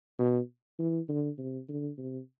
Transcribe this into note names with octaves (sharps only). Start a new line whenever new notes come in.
B2
E3
D3
C3
D3
C3